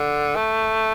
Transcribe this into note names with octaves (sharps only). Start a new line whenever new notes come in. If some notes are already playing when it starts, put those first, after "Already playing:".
Already playing: D3
A3